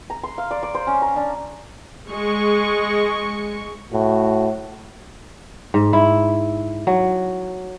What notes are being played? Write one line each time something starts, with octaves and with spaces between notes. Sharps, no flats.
A#5
C6
F5
D5
D5
C5
C#4
A#5
D4
G#3 C#6
A2 F#4
G#2
E4
F#3